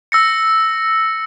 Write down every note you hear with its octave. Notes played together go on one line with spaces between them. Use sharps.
E6 A#6 C#7